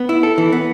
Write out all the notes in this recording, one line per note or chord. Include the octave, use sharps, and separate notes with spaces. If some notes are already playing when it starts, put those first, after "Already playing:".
Already playing: B3
E4
A4
E3
B3